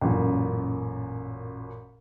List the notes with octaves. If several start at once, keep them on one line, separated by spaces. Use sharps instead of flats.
A1 F#2 A#2